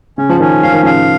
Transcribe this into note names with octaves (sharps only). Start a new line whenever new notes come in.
C#3 C#4
F3
D#3 C#4
F3 F5
D#3
C#3 F3 F5